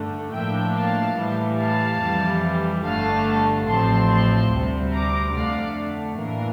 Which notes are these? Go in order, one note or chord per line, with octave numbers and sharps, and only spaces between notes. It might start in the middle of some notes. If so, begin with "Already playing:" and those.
Already playing: G2 D3 A3 D4
A2 F3 A#3 D4 E5 G5
F5 A5
A2 E3 G3
F5 A5
F2 E3 G3
G1 G2 D3 A3 D4 F5 A5
A1 A2 F3 C4 A5 C6
A5 C6
D2 C3 G3 C4
A#5 D6
F2 D3 A3 D4 D5 F5
A2 E3 A#3 D4 A#4